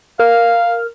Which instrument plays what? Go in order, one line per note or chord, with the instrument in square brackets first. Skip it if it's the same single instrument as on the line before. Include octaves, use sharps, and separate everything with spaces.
[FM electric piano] A#4 F6 [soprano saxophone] F5